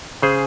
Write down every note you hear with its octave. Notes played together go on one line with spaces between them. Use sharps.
C#3 G#4 C5